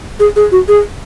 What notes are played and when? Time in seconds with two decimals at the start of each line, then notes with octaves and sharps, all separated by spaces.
0.20 G#4
0.36 G#4
0.52 F#4
0.68 G#4